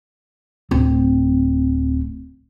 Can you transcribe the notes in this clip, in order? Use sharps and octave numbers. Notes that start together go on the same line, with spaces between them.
D1 C4